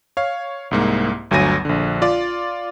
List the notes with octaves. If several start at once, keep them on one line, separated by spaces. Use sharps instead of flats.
C#5 F5
C2 G#2 A#3
G1 D2 F#3 G#5 A#6 D#7
A#1 D3
F4 D5